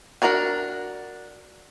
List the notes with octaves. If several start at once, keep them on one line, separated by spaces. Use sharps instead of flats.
D4 F#4 A#4 D5 G#5